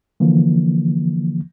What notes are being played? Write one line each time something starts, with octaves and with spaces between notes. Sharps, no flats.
D3 E3 F3 A#3